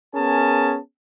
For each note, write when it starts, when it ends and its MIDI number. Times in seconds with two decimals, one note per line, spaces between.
0.15 0.77 59
0.15 0.77 61
0.15 0.77 68
0.15 0.77 70
0.15 0.77 80
0.15 0.77 81